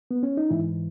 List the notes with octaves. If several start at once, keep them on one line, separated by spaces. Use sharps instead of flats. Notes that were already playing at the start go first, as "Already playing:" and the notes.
B3
C#4
D#4
G#2 E3 E4